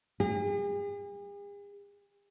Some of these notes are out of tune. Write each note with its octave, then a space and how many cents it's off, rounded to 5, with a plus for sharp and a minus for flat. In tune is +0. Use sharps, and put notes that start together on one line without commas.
G#4 -45